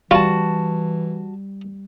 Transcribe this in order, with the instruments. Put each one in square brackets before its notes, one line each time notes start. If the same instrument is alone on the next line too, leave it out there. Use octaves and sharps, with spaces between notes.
[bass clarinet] E3 [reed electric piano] G3 [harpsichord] F4 [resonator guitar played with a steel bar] F#4 A5